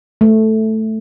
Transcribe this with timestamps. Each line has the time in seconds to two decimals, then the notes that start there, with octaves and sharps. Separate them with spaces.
0.21 A3